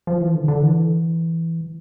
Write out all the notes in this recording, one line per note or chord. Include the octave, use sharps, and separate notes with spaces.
F3
E3
D3
D3
E3